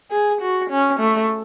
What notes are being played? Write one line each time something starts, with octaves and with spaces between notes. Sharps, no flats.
G#4
F#4
C#4
A3